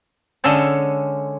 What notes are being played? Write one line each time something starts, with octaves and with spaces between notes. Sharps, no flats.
D3 G#3 C#4 A4 C#5